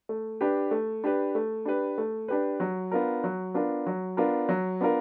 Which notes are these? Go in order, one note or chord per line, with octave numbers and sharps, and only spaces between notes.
A3
D4 G4 B4
A3
D4 G4 B4
A3
D4 G4 B4
A3
D4 G4 B4
F#3
B3 D4 F4 A#4
F#3
B3 D4 F4 A#4
F#3
B3 D4 F4 A#4
F#3
B3 D4 F4 A#4